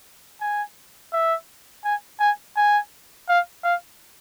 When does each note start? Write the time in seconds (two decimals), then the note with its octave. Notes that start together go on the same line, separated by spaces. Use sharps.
0.41 G#5
1.13 E5
1.84 G#5
2.20 G#5
2.57 G#5
3.29 F5
3.64 F5